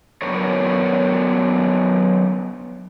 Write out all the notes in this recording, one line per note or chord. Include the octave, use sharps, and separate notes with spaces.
F#3 B3 C#4 D4 A#4 C#5